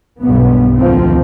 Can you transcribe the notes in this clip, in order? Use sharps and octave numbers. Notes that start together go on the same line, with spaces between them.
B1 G2 B3
D2 D#3 F3 C4